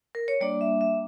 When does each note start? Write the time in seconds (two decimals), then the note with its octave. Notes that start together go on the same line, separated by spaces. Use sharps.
0.15 A#4
0.28 C#5
0.41 G3 A#3 D4 D5
0.61 E5
0.81 E5